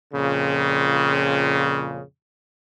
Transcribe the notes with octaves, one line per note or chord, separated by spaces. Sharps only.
F2 A#2 C#3